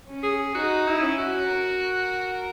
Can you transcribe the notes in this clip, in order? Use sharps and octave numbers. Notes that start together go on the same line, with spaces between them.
C#4
G#4
D#4 F#4
E4
C#4
F#4
A#4